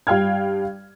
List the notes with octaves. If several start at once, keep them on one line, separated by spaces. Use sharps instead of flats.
G2 F5 G5 F6 G#6